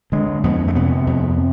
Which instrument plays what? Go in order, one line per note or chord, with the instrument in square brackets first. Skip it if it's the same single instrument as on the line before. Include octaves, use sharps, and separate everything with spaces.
[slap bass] D3 G#3
F2 B3
A3
C3 B3
F2